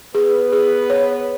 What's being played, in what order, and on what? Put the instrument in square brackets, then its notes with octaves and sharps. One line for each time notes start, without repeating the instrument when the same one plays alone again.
[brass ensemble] B3 B4 [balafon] G#4
[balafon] G#4
C#5